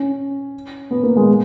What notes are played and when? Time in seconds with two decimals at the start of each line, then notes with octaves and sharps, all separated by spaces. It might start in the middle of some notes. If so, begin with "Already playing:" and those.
Already playing: C#4
0.91 B3
1.03 A#3
1.17 G#3
1.28 A#3